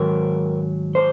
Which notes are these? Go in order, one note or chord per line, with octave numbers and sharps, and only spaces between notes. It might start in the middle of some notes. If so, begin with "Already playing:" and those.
Already playing: G#2 D#3 F#3 A#4
C5